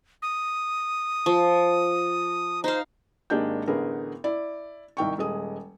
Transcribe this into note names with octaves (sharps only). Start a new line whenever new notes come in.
D#6
F3
D#4 C5 F5
G#1 G#3 A#3 D4 G4 G6
A1 D3 B3 G#4 A#4
E4 D5
C2 D#3 G5 C#6
D#1 G#3 D#6